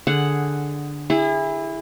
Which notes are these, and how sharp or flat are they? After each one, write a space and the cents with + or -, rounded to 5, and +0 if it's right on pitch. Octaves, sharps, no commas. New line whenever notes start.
D3 +0 G#4 +0 F#5 +0
E4 +0 G#4 -35